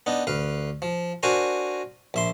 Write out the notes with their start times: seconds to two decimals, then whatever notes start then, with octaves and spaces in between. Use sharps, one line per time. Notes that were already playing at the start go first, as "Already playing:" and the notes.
0.06 B3 D4 D#4
0.27 D2 B4 F5
0.82 F3
1.23 D4 F#4 A#4 C5 G#5 A#5
2.14 A#1 E5 C6